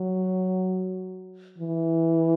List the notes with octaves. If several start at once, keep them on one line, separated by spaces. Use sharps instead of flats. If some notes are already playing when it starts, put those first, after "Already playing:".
Already playing: F#3
E3